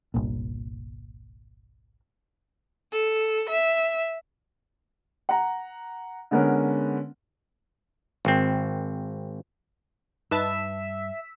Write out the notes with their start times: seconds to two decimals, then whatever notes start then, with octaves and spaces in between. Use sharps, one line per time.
0.14 G1 C2 A#2
2.92 A4
3.49 E5
5.29 F#5 A#5
6.31 D3 G#3 B3 C#4 A#4
8.25 G#1 C4
10.31 G2 D#4 B4 E5 A5 E6 B6